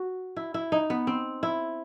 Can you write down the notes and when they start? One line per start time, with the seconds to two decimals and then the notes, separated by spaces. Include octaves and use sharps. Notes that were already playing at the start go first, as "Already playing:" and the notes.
Already playing: F#4
0.37 E4
0.54 E4
0.72 D#4
0.90 B3
1.07 C4
1.43 E4